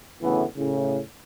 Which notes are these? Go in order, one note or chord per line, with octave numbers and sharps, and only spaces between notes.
D2 A2 C#3 E3 A3 B3
A2 C#3